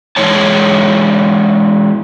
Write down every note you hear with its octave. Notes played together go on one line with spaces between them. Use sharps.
E3 G#3 D#4 C#5 A5